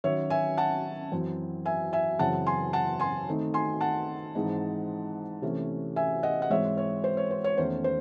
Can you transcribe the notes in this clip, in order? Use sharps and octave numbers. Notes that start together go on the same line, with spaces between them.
D#3 F#3 C#4 C#5 E5
E5 G#5
F#5 A5
F#2 E3 C4
E5 G#5
E5 G#5
F#2 C#3 E3 C4 F#5 A5
G#5 C6
F#5 A5
G#5 C6
D#3 A3 C4 D#4
G#5 C6
F#5 A5
G#2 E3 G#3 C4 D#4
C3 E3 A3 C#4
E5 G#5
D#5 F#5
F#5
G#2 E3 G#3 C4 C#5 E5
C#5
C5
C#5
C5
C#5
E2 D#3 A3 C#4 C5
C5